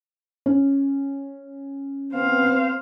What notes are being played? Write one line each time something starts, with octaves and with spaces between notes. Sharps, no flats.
C#4
B3 C4 C5 F5